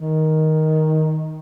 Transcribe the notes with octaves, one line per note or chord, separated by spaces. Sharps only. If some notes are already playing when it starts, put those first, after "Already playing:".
D#3